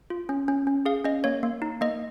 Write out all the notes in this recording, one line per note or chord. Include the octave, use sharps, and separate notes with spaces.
F4
C#4
C#4
C#4
G#4 F5
C#4 D#5
A#3 C#5
A#3
D#4
A#3 D#5